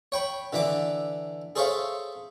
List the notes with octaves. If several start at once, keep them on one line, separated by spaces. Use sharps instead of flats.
C#5 G5 B5
D3 E3 D4 E5 D6
G#4 A4 C5 C#5 E5 F5